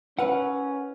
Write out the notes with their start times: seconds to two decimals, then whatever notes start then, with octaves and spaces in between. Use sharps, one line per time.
0.19 C#4 E4 A#4 B4 F#5